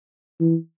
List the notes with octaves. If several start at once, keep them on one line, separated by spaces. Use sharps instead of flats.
E3